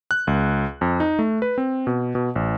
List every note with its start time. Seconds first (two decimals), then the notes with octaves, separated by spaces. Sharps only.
0.11 F#6
0.27 C#2
0.81 F2
1.00 D#4
1.19 A3
1.42 B4
1.58 C4
1.87 B2
2.15 B2
2.36 A1